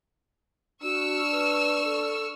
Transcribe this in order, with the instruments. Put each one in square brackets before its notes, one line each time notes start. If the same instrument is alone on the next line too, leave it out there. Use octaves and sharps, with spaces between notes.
[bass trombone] D4 [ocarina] F#4 [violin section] C#6 E6 F6
[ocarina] B4
A4